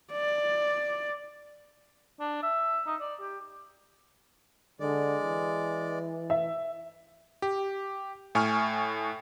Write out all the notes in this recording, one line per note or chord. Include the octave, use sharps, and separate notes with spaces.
D5
D4
E5
D#4
D5
G4
D3 G#3 D5
E3
E5
G4
A2 G#5 C#6 F6